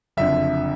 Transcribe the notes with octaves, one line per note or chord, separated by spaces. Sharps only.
F#1 F2 D3 E5